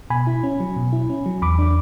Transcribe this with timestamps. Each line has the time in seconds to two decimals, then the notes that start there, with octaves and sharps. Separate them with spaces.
0.10 B2 G#5 B5
0.27 E4
0.43 C#4
0.60 F#3
0.76 B2
0.93 E4
1.10 C#4
1.26 F#3
1.42 E2 B5 D6
1.59 D4